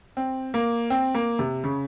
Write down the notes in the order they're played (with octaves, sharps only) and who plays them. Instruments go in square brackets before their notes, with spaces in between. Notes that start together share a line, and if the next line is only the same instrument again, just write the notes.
[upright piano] C4
A#3
C4
A#3
C3
C#3